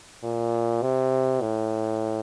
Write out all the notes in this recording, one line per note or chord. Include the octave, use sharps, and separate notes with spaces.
A#2
C3
A2